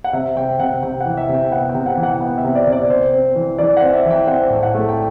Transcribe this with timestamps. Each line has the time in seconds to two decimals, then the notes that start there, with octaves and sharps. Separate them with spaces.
0.04 F#5
0.13 C3 E5
0.36 C3 G5
0.59 C3 F#5
0.83 C3 G5
1.00 F#5
1.06 E3
1.17 E5
1.29 C3
1.34 G5
1.51 B3 F#5
1.69 G5
1.75 C3
1.86 F#5
1.97 E3
2.03 F#5
2.16 F#5
2.20 B3 G5
2.38 E5
2.44 C3
2.55 D5
2.67 C3
2.72 D5
2.90 C4 C5
3.13 C4
3.36 E3
3.58 E3 D5
3.77 C4 F#5
3.93 E5
4.05 E3
4.11 G5
4.27 C4 F#5
4.50 A2
4.63 F#5
4.74 A3
4.89 G5